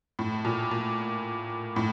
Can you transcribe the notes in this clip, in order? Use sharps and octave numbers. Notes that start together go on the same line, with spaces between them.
A2
A#2
A#2
A2